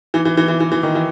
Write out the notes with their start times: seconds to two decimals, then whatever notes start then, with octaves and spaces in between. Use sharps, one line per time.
0.14 E3
0.25 E3
0.37 E3
0.48 E3
0.60 E3
0.72 E3
0.83 D#3
0.95 E3